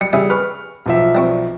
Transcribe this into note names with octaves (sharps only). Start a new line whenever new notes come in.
G3 C#7
C#3 G3 G#4 E5 G#5
B4 C#6 F6
B1 F3 E5
G3 C4 C#6